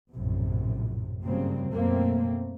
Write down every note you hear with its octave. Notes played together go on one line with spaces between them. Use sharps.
A#1 F#2 A2 C3
G2 C#3 F#3 G3 A#3 C4
F#2 B2 A3 A#3 C4